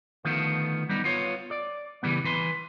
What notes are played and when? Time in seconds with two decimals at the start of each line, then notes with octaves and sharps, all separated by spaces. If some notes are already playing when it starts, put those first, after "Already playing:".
0.25 D3 D#3 F3 A3 B3
0.89 G3 B3 D#4
1.04 B3 F4 C#5
1.51 D5
2.03 C#3 E3 G3 B3
2.24 E3 B4 C6